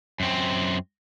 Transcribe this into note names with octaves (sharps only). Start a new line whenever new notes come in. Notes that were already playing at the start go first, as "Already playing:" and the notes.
F#2 C4